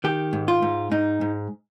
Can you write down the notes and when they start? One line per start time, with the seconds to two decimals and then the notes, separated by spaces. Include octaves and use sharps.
0.04 D#3 G4
0.33 G#2
0.48 F4
0.62 G#2
0.91 G#2 D#4
1.21 G#2